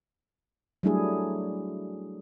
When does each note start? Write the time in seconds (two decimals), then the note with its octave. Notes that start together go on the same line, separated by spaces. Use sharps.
0.83 F#3 G3 A3 D4 E4 G#4